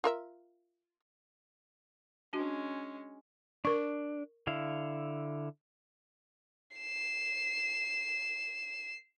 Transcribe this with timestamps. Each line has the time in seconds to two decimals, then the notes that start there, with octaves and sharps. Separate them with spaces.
0.04 F4 A#4 E5
2.33 G#3 C#4 D4 F#4
3.65 D4 A#4 C#6
4.47 D3 E4 F5
6.77 C7 E7